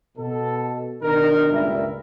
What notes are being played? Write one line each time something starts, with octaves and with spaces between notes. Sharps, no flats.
B2 A4
B2 D#3 D4 A#4
C#2 G2 A#2 G3 A#4 E5